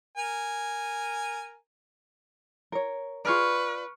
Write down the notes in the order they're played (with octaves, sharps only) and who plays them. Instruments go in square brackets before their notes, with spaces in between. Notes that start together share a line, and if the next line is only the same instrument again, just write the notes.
[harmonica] A#4 G#5
[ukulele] A#4 C#5
[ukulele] F4 G#4 D5 [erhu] B4 [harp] C#6 F6 D7